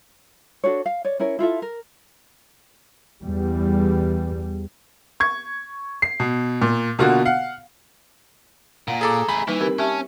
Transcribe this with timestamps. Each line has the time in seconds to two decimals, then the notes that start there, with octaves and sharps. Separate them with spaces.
0.64 D4 F#4 A4 C#5
0.86 F5
1.05 C#5 D5
1.20 C#4 E4 A#4 C#5
1.39 E4 F4 A4 E5
1.62 A#4
3.22 E2 G3
5.20 C#6 G#6
6.02 C7
6.20 B2
6.62 A#2
6.99 B2 D3 A#3 F4 F#4
7.25 F5 F#5
8.88 A#2 F5 F#5
9.01 G#4 A4 A#5 D6
9.29 A3 G#4 B5
9.48 E3 G3 A#3 D#4 E4 B4
9.61 C4 G4 A#4
9.78 C#4 G4 E5 A5 C#6